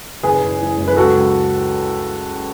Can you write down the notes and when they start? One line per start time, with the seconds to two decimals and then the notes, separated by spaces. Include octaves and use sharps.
0.23 F#1 G#4 B4
0.42 F#1
0.60 E3
0.78 F#2
0.88 B4
0.97 C#2 F#4 A4
1.15 C#2